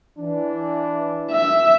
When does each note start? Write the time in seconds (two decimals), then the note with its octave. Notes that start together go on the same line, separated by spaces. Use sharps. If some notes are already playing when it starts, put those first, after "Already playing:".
0.17 E3 D4
1.32 E5